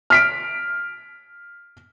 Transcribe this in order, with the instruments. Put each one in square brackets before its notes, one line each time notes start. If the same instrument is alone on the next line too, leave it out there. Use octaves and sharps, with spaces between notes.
[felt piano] F6 B6 D7